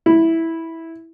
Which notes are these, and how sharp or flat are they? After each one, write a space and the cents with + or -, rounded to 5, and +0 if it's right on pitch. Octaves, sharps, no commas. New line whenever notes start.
E4 -10